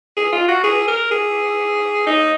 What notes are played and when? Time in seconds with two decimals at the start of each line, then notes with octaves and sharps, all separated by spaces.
0.17 G#4
0.32 F4
0.48 F#4
0.64 G#4
0.88 A#4
1.11 G#4
2.07 D#4